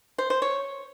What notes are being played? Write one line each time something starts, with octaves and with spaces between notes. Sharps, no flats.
C5
C5
C#5